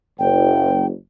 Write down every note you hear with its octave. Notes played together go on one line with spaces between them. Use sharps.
F#1 G5